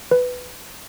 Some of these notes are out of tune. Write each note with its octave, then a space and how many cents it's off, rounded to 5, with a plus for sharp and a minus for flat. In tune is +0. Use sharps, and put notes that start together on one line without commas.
B4 +10